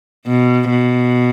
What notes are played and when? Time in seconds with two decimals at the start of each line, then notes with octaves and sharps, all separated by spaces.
0.26 B2
0.70 B2